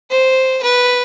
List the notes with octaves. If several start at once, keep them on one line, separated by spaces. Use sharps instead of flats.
C5
B4